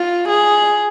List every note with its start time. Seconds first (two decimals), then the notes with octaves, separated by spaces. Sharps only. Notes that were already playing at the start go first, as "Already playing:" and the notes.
Already playing: F4
0.28 G#4